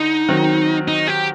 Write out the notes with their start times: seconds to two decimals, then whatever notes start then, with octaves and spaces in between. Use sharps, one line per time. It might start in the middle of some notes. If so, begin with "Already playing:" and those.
Already playing: D3 D#4
0.29 D#3 F#3 C4
0.88 D#4
1.08 G4